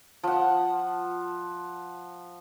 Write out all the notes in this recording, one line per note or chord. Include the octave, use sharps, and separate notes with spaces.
F3 F#5